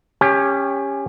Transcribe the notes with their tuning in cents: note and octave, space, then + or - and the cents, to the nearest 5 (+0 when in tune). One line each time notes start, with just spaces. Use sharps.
C#4 +0 G4 +25